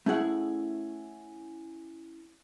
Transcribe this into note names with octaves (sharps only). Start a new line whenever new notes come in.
A3 C#4 E4 G#4 F#5